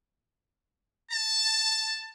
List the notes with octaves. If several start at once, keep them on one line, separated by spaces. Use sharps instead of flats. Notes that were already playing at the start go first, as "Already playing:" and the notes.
A5